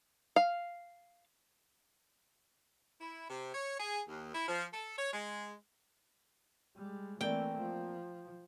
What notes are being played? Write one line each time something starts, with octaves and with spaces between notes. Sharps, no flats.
F5
E4
C3
C#5
G#4
D#2
E4
F3
A4
C#5
G#3
G3 G#3
E3 A3 A#3 C4 D5 G5
F3